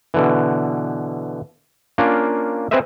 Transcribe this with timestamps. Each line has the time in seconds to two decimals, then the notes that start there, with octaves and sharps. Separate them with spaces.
0.14 B2 D3 E3
1.98 A#3 C#4 D4 F4
2.71 C4 G#4 B4 C5 D#5 E5